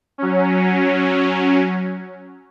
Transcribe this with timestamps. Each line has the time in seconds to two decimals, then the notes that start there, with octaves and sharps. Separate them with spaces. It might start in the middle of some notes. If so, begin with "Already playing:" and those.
0.18 F#3 C#4